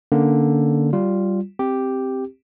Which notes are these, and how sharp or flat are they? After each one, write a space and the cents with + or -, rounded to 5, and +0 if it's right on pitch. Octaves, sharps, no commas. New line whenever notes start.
D3 +0 A#3 +0 C#4 +0
G3 -15 F4 +0
C4 +0 G4 +0